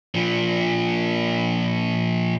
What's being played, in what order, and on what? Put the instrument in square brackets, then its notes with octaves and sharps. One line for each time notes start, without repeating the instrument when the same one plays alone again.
[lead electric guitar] A#2 F3